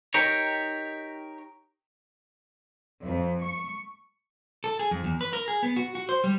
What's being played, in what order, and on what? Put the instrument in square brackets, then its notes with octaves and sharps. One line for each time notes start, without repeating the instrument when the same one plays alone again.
[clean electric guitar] D#4 G4 A#4 C#5
[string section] F2
C#6
[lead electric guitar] A4
G#4
F2
E2
B4
A#4
G#4
B3
F#4
F#4
C5
G3